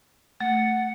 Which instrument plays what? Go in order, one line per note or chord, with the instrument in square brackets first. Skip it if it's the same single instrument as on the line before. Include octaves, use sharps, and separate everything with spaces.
[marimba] A3 [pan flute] F#5